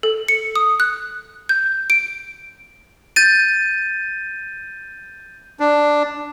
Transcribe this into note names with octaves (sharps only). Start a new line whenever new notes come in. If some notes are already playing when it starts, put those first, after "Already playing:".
A4
C#7
D#6
F#6
G6
D7
G6 A6 D#7
D4